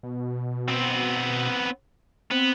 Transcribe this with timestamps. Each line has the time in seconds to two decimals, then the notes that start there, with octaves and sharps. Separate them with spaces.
0.03 B2
0.68 B3 C4
2.31 B3 C4